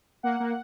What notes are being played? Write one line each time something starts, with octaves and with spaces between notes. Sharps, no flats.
A#3 F#5
A#3